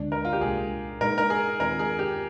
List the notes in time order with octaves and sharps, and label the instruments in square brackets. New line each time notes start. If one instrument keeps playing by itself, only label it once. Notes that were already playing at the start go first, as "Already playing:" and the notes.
Already playing: [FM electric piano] D2 D3 G#3 [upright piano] D4
[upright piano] A#4
F4
G4
[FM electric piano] C2 A#2 G#3 [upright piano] G#4
[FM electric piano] A#2 G#3 D#4 G#4 [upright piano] A#4
[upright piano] A#4
G#4
[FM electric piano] D#2 D#3 G#3 C4 F4 [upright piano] A#4
[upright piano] G#4
G4